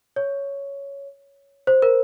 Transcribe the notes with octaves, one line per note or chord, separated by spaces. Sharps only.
C#5
C5
A#4